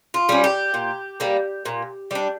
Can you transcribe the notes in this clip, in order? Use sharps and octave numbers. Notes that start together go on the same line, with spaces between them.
F4
G3 C#4
G4
A#2
G3 A#3
A#2
G3 D4